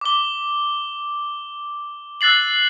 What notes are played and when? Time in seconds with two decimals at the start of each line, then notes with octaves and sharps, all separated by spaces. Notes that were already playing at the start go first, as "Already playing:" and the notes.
0.01 D6 G7
2.21 E6 F#6 A6 C7 F#7